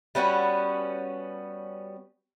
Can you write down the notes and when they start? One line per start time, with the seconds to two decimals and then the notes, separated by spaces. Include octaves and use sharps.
0.15 G3 B3 C#4 F#4